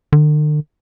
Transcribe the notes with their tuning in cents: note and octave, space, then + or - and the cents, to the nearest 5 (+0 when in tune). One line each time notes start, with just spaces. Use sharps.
D3 +45